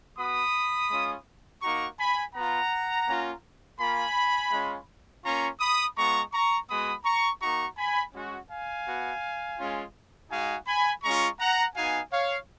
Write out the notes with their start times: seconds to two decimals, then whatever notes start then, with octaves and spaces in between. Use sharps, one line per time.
0.17 B3 F#4 B5 D#6
0.90 G#3 C#4 F4
1.62 A#3 D#4 F#4 A#5 C#6
1.98 G#5 B5
2.34 B3 F4 F#5 A#5
3.07 A#3 C#4 F4
3.79 A#3 F4 G#5 B5
4.52 G#3 C#4 F4
5.24 A#3 C#4 F4 A#5 C#6
5.60 B5 D#6
5.96 G#3 B3 F4 A#5 C#6
6.32 A#5 C#6
6.69 G#3 B3 F#4 B5 D#6
7.05 A#5 C#6
7.41 A#3 D#4 F#4 A#5 C#6
7.77 G#5 B5
8.14 G#3 C#4 F#4
8.50 F5 G#5
8.86 B3 F#4
9.58 G#3 C#4 F4
10.31 G#3 D#4 F#4 F5 G#5
10.67 G#5 B5
11.03 G#3 C#4 F4 A#5 C#6
11.39 F#5 A#5
11.75 B3 D#4 F#4 F5 G#5
12.12 C#5 F5